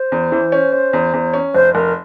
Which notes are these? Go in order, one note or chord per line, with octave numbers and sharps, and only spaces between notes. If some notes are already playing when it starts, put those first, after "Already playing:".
Already playing: C5
E2
E3
C#4
C#4
E2
E2
C#4
F1 C5
F1 A#4